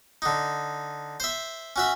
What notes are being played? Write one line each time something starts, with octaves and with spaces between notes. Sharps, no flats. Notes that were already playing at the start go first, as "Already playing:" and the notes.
D3 D#4
C5 E5
C#4 F#4 E5